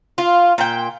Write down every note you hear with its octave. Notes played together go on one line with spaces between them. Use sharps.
F4
A#2 G5